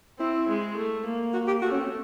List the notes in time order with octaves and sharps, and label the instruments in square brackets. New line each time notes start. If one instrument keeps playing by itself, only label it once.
[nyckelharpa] C4 [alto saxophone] E4
[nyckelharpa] G#3
A3
A#3
[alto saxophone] F#4
G4
[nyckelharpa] A3 [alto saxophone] F#4
[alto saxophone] C#4
C4